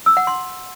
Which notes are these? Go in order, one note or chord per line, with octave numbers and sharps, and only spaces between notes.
E6
F#5
C6